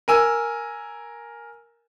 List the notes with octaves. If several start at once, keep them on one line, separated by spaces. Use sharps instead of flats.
A#4 G#5 E6